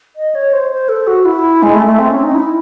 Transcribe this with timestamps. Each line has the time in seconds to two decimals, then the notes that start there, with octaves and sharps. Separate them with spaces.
0.16 D#5
0.35 C#5
0.53 C5
0.72 C5
0.89 A4
1.07 F#4
1.25 E4
1.62 G#3
1.74 A3
1.86 A3
1.98 C4
2.10 C#4
2.23 D#4
2.34 E4